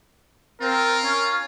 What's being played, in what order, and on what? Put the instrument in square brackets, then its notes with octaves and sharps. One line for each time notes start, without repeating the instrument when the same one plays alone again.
[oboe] C4 [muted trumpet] F4 [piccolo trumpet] A#4
[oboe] C#4